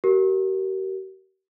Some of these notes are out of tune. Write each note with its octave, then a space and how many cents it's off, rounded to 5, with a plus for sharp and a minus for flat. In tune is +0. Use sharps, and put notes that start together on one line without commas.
G4 -45 A#4 +0